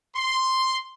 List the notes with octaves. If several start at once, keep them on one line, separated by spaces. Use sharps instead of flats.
C6